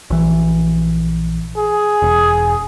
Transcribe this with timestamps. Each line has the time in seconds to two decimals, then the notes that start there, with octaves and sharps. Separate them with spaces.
0.10 A#1 E3
1.57 G#4
2.02 E1